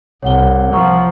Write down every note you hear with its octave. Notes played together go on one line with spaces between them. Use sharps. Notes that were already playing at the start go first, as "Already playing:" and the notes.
C2 C#5 F#5 G7
F3 F#5 A#5 C#6